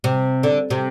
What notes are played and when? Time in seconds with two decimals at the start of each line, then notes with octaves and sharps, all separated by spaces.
0.04 C3
0.43 D3
0.70 C3